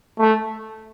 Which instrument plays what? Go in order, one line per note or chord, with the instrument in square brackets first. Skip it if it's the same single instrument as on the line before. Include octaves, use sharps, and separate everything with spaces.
[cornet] A3